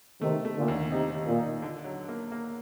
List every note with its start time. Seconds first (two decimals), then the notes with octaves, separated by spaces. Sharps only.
0.21 C3 D#3 A3
0.45 A3
0.57 A#2 D3
0.68 D#2
0.91 C3 D#4
1.15 D#2
1.26 A#2
1.39 D#4
1.62 D3
1.84 F#3
2.09 A#3
2.32 A#3